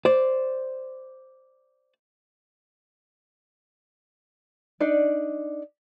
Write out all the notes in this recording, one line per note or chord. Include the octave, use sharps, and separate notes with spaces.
C5 D5
D4 D#4 D5